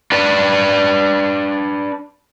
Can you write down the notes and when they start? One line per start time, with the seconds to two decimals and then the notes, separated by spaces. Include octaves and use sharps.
0.12 D4 B4